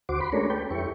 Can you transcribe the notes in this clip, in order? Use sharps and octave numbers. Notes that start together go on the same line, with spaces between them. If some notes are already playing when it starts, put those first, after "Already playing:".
D2 F#4 C5 D6
B5 C6
G#3 A3 C#4 D4 A#4 C#5
A4 B4 G5
F2 E4 G4 C#6